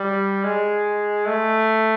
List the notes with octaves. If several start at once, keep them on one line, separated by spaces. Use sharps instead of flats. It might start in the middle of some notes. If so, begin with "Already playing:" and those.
Already playing: G3
G#3
A3